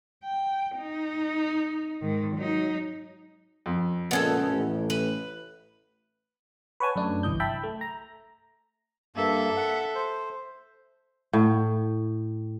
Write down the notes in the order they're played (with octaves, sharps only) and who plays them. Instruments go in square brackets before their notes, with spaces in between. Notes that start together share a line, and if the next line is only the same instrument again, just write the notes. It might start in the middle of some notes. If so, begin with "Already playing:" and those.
[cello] G5
D#4
G#2 D#3
F#3 D#4
[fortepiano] F2
[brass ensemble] C#2 D#5 [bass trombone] A#2 [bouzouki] B3 C#4 A4
[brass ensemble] A1 [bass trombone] A2
[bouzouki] B4
[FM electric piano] B4 C#5 F#5 G#5 A5
F#2 A3 D4
G1 C2 E3 D#5 G6
E5 G5 A5 B5
A3
A#5
[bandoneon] G2 A#3 [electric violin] A4 E5
[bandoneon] F#5
C5
[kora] A2